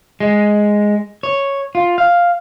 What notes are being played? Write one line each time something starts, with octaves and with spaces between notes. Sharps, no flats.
G#3
C#5
F4
F5